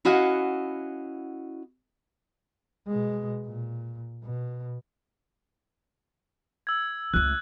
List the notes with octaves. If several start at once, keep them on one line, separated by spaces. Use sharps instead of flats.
C#4 E4 F#4 D#5 F5 F#5
B2 G#3
A#2
B2
E6 G#6
C#2 A3 F#6